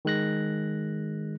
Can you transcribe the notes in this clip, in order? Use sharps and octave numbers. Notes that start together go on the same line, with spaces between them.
D#3 G#3 F#6 A#6